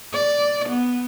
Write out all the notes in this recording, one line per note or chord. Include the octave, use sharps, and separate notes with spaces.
D5
B3